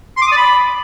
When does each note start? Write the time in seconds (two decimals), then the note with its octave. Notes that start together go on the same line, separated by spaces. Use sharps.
0.17 C6
0.22 D6
0.27 D#6
0.32 D5
0.37 B5